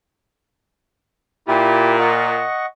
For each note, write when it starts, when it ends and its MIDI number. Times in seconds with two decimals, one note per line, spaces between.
1.48 2.43 46
1.48 1.96 64
1.48 1.96 67
1.99 2.66 75
1.99 2.66 78
1.99 2.66 85